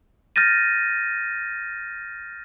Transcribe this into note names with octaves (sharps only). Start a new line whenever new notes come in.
F6 G6 A6 A#6 D#7